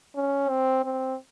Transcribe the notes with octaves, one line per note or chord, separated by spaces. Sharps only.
C#4
C4
C4